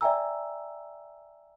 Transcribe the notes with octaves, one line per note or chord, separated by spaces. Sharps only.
D5 E5 G5 G#5 A#5 E6